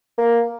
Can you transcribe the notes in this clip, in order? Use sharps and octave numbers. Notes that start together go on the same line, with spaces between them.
A#3